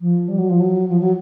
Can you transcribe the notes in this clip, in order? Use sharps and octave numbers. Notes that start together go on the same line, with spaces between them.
F3
G3
F#3
F3
F#3
F3
F#3